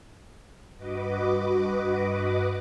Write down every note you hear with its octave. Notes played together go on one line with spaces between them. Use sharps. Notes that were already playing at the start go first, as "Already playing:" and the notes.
G2 F#4 B4 D#5 D6